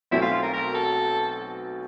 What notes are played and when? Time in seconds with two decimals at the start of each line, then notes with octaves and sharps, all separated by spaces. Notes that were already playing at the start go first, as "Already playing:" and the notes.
0.11 B1 B2 F#3 A3 C4 E4
0.22 F4
0.33 F4
0.43 A#4
0.54 A#4
0.75 A4